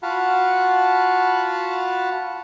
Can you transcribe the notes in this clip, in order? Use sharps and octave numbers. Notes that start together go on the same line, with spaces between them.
F4 F#4 F5 F#5 A5 B5